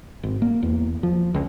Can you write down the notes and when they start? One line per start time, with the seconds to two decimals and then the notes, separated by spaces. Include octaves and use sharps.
0.23 G#1
0.42 A#3
0.63 E2
1.03 F3
1.34 C#2